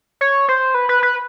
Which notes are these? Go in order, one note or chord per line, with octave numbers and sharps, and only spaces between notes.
C#5
C5
B4
B4
B4